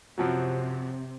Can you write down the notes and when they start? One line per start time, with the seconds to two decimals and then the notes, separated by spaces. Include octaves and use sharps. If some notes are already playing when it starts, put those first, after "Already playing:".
0.18 F#2 C3 F3 F#3